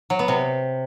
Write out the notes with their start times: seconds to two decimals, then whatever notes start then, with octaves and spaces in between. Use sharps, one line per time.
0.10 F#3
0.19 B3
0.28 C3